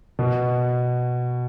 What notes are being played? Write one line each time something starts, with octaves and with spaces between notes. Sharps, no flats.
B2